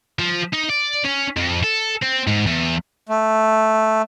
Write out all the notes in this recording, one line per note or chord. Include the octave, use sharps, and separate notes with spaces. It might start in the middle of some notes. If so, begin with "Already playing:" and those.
F3
D#4
D5
C#4
F2
A4
C4
G#2
E2
A3